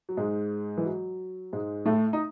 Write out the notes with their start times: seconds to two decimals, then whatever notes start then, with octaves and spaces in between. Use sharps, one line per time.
0.09 F#3
0.17 G#2 G#3
0.77 E3
0.85 F#3
1.53 G#2 G#3
1.86 A2 A3
2.13 D#4